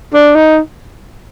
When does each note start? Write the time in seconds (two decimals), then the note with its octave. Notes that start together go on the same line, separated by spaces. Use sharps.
0.14 D4
0.35 D#4